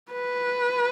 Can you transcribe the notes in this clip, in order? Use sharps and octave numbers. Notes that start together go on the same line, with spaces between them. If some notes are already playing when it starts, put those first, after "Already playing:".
B4